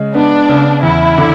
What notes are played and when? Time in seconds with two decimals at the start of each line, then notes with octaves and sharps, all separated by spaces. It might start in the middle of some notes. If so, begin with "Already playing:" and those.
Already playing: C#3 G#3
0.15 B3 D4
0.49 C#3
0.83 E2 E4
1.18 D3